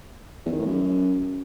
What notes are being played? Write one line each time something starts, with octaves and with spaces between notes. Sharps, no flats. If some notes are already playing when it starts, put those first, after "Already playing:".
E2
D#3
A2
F#2